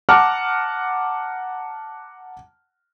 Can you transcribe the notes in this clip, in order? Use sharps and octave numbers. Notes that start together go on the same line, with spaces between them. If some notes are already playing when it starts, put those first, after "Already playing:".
F#5 A5 A#5 D6 F6